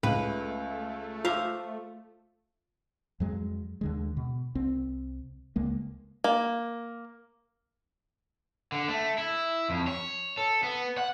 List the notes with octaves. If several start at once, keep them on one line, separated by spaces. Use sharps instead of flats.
C#2 A3 B4
F4 C5 E5 F5 D6
F2 F#3 G#3
D#2 D3 G#3
B2
C2 C4
C#2 G#3 A#3
A#3
D3
A3
E4
F2
C#5
A4
B3
F#5